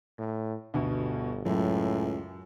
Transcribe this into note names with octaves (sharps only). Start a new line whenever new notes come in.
A2
G1 D2 B2
C#2 F#2 A2